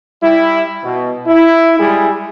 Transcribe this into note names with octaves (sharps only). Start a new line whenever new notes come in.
G3 E4
B2
E4
G3 G#3 E4 G#4